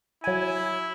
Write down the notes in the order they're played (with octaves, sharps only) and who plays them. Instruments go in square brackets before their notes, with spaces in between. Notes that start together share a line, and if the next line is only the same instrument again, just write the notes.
[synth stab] F#3 G#5 [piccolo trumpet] E4